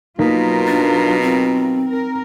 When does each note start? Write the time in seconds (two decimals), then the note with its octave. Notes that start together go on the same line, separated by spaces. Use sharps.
0.19 B2 F#3 A#3 D#4 F4 A#4 B6
0.67 D4 A6
1.22 C4
1.87 A#4